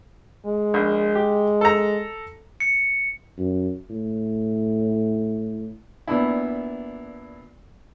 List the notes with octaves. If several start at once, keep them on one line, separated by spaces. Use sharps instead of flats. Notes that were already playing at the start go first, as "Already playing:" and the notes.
G#3
A#1
G4
A4 A#5
C#7
F#2
A2
A#2 B3 D4 E4